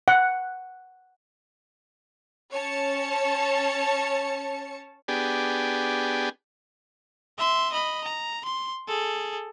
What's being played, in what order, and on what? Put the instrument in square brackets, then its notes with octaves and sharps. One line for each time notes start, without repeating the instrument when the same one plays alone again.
[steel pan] F#5
[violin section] C#4 C#5 A5 C#7
[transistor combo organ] B3 D4 G4 G#4
[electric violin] E5 C6
D#5 B5
A#5
C6
G#4 A4